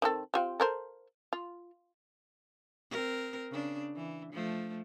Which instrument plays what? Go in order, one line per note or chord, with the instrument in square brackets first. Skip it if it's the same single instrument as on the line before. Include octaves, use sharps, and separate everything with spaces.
[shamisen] D#3 C4 A4
C4 F4 G4
A4 A#4 C5
F4
[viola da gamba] C4 A#4
C#3 D4
E3
F3 A3